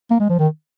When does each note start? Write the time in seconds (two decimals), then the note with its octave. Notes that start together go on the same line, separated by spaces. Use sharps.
0.10 A#3
0.20 G#3
0.30 F3
0.39 D#3